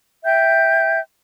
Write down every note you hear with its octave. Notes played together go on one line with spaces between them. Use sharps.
E5 G5 G6